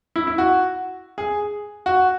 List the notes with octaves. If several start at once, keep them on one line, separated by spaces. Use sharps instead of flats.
E4
E4
F#4
G#4
F#4